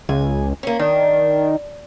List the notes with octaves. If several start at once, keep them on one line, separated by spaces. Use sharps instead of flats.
C#2 G#5
A#3 C#4
D#3 D4